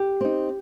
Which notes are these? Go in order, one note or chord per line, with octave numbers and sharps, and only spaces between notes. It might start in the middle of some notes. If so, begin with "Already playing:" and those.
Already playing: G4
C4 D#4